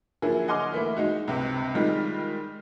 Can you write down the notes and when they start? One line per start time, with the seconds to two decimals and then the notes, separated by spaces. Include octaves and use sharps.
0.22 D3 F3 F#3 A#3 E4 G#4
0.48 D#5 F#5 G#5 C6 D6 F6
0.72 E3 A3 A#3 E4
0.96 G#3 D#4 F#4
1.28 C#2 G2 C3
1.75 D#3 G3 G#3 D#4 F4